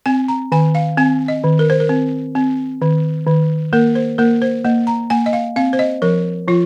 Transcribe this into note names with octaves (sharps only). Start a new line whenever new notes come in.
C4 G#5
A#5
D#3 G#5
F5
C4 G#5
D#5
D#3
A#4
C5
A#4
C4
C4
D#3
D#3
A#3 A#4
C5
A#3 A#4
C5
A#3 D#5
A#5
A#3 G#5
D#5
F5
C4 F5
C5
D#5
F3 A#4
F3 F4